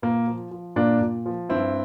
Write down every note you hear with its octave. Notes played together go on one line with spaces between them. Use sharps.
A#2 A#3
F3
F3
A#2 A#3 D4
A#2
F3
G2 C4 E4